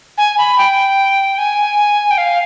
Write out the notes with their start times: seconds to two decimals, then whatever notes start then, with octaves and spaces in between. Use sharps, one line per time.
0.18 G#5
0.38 B5
0.58 G5
1.38 G#5
2.11 G5
2.18 F5